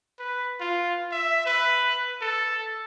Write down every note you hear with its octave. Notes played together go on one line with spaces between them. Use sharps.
B4
F4
E5
B4
A4